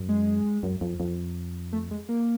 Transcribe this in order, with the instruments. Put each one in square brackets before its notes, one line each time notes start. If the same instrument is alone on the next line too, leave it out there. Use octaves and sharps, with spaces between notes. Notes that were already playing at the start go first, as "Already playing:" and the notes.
Already playing: [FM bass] F#2
[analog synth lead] G#3
[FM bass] F#2
F2
F2
[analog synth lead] A3
G#3
A#3